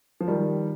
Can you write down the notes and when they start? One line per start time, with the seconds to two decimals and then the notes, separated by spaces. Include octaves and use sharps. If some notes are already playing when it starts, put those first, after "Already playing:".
0.21 F3
0.28 D#3 G3